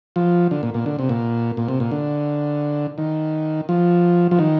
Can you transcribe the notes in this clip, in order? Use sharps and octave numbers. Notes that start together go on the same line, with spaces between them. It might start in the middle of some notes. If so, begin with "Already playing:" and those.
F3
D3
A#2
A#2
D3
C3
A#2
A#2
C3
A#2
D3
D#3
F3
F3
D#3